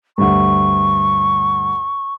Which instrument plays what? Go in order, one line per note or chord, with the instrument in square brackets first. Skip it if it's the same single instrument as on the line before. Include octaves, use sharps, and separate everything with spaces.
[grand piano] D2 G2 [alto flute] C#6